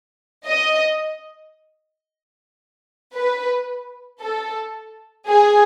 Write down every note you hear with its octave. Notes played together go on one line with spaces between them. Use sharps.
D#5
B4
A4
G#4